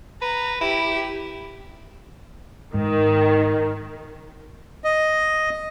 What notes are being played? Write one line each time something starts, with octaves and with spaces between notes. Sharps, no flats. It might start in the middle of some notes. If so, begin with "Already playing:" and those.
B4 A#5
E4 G4
G#2 D#3
D#5